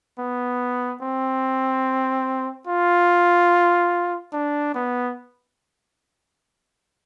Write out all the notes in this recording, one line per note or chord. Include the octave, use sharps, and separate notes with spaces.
B3
C4
F4
D4
B3